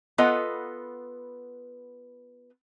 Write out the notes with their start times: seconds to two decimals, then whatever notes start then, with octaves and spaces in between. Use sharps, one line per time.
0.18 B3 F4 A4 B4 D#5 F#5